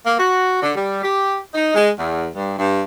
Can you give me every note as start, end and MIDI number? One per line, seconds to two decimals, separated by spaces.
0.07 0.16 58
0.19 0.61 66
0.62 0.74 50
0.75 1.01 55
1.03 1.38 67
1.55 1.71 63
1.75 1.90 56
1.99 2.29 40
2.35 2.54 43
2.59 2.81 43